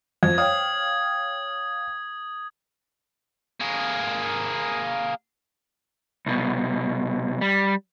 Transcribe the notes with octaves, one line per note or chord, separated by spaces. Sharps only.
F2 G#6
C#5 F5 G5 D#6
A#3 G#4
C2 B2
G3